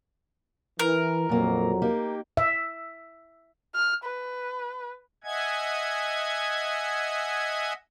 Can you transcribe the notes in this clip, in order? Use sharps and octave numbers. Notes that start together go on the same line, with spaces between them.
E3 A#4
F2 A#2 F#3 A#3
A#3 D#4 G4
E5
F6
B4
D#5 E5 F#5 G#5 G#6